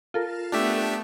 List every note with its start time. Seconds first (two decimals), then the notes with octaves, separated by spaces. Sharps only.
0.14 F4 A4 A#4
0.52 A3 B3 D4 G4 E5